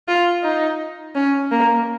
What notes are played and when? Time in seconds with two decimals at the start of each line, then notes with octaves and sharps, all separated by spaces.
0.08 F4
0.43 D#4
1.15 C#4
1.51 A#3